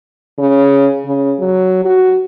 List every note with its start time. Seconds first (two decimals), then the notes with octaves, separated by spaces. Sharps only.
0.39 C#3
1.05 C#3
1.39 F#3
1.84 F#4